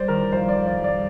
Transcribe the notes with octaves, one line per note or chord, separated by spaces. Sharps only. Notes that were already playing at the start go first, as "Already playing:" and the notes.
Already playing: G3 C5 D5
D#3 A#4
F2 C5
D5
F2
D5
G3
D5